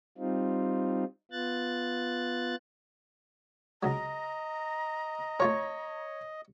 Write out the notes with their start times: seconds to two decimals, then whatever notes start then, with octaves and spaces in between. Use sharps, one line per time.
0.18 G3 C4 D#4 F4
1.31 B3 F4 F#6 A6
3.83 C#2 F#3 D#5 A#5
5.40 A3 F4 A#4 C#5 C#6